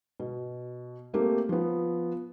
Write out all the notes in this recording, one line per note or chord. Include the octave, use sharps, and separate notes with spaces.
B2
A3 A#3 C4 G4
F3 B3